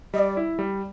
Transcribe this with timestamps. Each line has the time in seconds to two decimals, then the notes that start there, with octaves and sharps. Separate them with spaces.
0.14 G3 D#5
0.19 D5
0.37 E4
0.59 G3